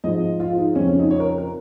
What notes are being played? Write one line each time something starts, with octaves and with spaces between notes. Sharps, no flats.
G#2 F3 D#5
F4
D#4
F2 C#3 F3 C#4
C#4
D#4
C#5
A#4
A#4